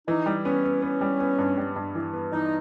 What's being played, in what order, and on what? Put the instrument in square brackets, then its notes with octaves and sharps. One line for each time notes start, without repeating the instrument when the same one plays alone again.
[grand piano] E3 [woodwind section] D#4
[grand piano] G3
[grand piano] B3 [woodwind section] C#4
[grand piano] B3
B3
G3
B3
G2
G3
G2
E3
B3
[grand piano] E3 [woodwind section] D#4